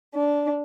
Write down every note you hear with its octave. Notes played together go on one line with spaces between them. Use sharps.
D4